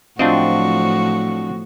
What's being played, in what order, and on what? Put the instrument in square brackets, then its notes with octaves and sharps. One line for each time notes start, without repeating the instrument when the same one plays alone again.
[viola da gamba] A2 F3 F#3 [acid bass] C4 [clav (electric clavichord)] D4 F4 D#5 [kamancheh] F#4